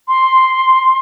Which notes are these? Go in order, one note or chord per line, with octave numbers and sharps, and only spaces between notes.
C6